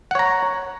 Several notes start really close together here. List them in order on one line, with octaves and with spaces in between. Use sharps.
F#5 C#5 A#5